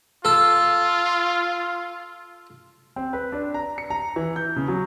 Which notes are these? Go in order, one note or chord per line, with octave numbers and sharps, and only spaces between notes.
F4 A4
C4
B4
D4
A#5
C#7
A#5
E3
G6
C#3
F#3